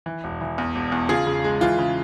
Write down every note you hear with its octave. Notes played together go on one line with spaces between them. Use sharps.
E3
E1
E3
E2
E1
E2
C#3 F4 G#4
C#3
G#3
E3 F4
C#3